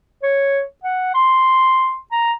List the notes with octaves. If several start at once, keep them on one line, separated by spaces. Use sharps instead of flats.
C#5
F#5
C6
A#5